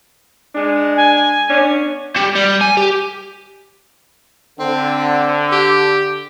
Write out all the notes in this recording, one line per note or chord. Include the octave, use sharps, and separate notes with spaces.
G#3 D4
G#5
B3 C#4 D4
G3
G3
G#5
G4
D3 C4
G4